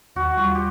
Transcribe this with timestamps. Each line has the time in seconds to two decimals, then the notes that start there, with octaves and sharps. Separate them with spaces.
0.16 D#2 F#4
0.37 G3 F4
0.55 G4